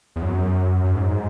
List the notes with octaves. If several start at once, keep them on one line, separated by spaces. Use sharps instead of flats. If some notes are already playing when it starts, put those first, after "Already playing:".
E2
F#2
F#2
G#2